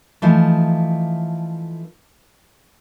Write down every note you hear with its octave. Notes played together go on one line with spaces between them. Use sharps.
E3 F3 A3 D#4